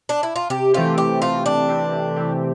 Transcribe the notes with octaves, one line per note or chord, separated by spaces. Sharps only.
D4
E4
F4
C3 G4
E3 A3 C4 F4 G4
C3 G4
E3 A3 C4 F4 G4
C3 D4
E3 A3 C4 G4
C3
E3 A3 C4 G4